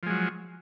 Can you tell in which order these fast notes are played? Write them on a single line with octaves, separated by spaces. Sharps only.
F3 G#3 F#3